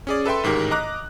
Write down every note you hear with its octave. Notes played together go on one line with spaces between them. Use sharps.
C#4 G#4 D5
A4 B4 E5 G5 C6
A1 G#2 D#3 G4 A#4
D#5 A#5 D6 F#6